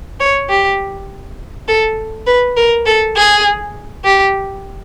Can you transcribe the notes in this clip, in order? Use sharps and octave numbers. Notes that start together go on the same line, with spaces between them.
C#5
G4
A4
B4
A#4
A4
G#4
G4